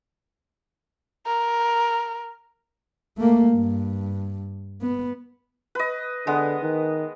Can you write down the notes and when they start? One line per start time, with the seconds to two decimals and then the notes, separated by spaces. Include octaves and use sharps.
1.26 A#4
3.18 A3 A#3
3.49 G2
4.81 B3
5.75 B4 D#5
6.27 D3 G#3 B3
6.62 D#3